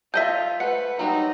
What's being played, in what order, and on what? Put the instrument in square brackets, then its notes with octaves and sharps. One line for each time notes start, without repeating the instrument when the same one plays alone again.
[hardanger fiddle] F4 [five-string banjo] A4 D#5 E5 [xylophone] G6 B6
[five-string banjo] A3 C5 F#5 [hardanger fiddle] B4 [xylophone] C#7
[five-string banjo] F#3 G3 C4 [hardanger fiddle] D#4